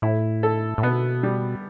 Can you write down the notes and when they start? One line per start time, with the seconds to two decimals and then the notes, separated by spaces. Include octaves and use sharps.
0.02 A2 E4
0.43 A4
0.78 A2
0.83 B2 B3
1.23 G3